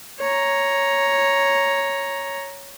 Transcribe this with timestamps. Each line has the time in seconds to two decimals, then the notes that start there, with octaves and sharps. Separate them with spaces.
0.20 C#5 A#5